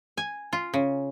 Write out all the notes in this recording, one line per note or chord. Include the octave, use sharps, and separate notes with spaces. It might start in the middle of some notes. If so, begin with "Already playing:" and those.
G#5
F4
C#3